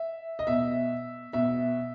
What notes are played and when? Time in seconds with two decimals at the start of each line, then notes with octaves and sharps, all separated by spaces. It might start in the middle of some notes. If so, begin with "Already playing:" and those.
Already playing: E5
0.39 D#5
0.47 B2 E5
1.33 B2 E5